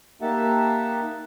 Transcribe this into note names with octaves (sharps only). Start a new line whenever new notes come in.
A#3 D#4 G4 E5 F#5 A5